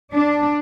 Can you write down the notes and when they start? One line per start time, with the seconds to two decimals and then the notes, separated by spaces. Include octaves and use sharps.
0.14 D4